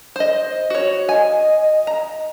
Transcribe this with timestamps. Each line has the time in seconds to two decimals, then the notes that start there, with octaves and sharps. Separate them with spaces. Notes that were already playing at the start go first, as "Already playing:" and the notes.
0.16 C5 D#5
0.70 F#4 C#5
1.09 D#5 G#5
1.87 A#5